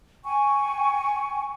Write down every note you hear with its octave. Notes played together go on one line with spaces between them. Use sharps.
G5 G#5 C#6